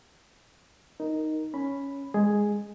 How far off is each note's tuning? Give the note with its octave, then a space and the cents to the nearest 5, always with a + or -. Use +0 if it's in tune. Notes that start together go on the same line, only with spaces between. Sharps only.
D#4 +0 A#4 +0
C#4 +0 B5 +0
G#3 -10 G#4 +0